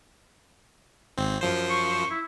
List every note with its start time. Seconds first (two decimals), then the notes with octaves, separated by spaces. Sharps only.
1.18 G#1 C4
1.41 F#2 F3 C5
1.70 C#6
2.10 E4